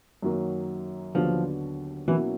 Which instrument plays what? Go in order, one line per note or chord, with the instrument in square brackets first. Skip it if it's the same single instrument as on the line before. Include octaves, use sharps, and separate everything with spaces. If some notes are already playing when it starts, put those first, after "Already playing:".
[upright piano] F#2 D#3 F#3 A#3
[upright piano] D#2 D3 F#3 B3 D4 [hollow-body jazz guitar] F3
[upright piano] B2 F#3 A#3 C#4 E4 [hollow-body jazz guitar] E3